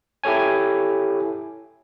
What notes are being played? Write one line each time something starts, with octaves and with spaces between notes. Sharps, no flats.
E4 G4 A4 C#5 G#5